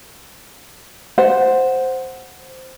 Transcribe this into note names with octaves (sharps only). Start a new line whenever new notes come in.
C5 F#5